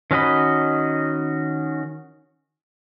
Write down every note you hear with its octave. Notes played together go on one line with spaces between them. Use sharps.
D#3 C#4 F#4 D#5 B5